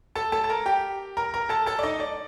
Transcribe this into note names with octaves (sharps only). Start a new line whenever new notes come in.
A4 A5
A4 A5
A5
A#4 A#5
G4 G5
A#4 A#5
A#4 A#5
A4 A5
A4 A5
D5
D#4 D#5
D5